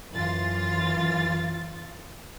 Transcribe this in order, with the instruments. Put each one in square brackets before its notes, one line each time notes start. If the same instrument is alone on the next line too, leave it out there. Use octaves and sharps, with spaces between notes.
[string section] F#2 E3 F4 A6